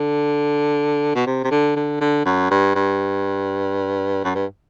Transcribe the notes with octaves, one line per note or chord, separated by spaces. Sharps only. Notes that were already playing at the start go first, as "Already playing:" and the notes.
Already playing: D3
B2
C3
C3
D3
D3
D3
F#2
G2
G2
F#2
G2